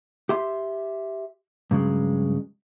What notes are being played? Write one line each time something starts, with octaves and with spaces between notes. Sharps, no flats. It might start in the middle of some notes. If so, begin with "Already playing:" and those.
G4 E5 C6
G2 C#3 F#3 G#3